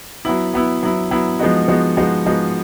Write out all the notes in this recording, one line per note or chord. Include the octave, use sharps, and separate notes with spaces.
F#3 B3 E4
F#3 B3 E4
F#3 B3 E4
F#3 B3 E4
F3 G#3 B3 D#4 F#4
F3 G#3 B3 D#4 F#4
F3 G#3 B3 D#4 F#4
F3 G#3 B3 D#4 F#4